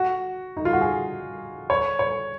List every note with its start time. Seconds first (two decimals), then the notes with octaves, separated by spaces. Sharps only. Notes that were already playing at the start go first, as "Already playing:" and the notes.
Already playing: F#4
0.57 D#4
0.65 F4
0.73 F#4
0.81 G#4
1.70 C#5
1.99 C#5